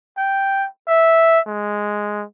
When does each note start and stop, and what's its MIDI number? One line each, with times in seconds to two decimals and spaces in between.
0.17 0.67 79
0.88 1.40 76
1.47 2.24 56